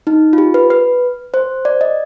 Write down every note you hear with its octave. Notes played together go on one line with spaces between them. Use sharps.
D#4
F4
G4
B4
B4
C5
D5
D#5